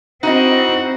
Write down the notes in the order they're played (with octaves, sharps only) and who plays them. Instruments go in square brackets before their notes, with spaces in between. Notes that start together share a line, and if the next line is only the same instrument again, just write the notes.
[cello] C4 [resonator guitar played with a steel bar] D#4 E4 D#5 [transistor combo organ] F#4